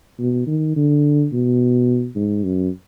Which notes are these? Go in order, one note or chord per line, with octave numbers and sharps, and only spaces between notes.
B2
D#3
D3
B2
G#2
F#2